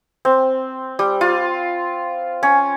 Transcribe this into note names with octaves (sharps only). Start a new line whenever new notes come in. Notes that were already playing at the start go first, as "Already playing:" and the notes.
C4
G3
F4
C#4